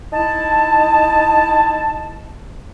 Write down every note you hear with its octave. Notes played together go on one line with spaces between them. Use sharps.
D#4 E4 A5